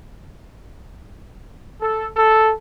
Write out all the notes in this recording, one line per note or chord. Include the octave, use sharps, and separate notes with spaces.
A4
A4